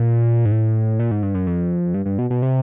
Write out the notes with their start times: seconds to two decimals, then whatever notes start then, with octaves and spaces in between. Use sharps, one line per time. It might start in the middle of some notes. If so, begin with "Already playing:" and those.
Already playing: A#2
0.45 G#2
0.52 A2
1.00 A#2
1.11 G#2
1.23 G2
1.35 F#2
1.47 F2
1.94 G2
2.06 G2
2.19 B2
2.30 B2
2.42 C3